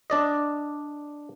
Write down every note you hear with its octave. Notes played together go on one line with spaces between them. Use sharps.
D4 D5 D#5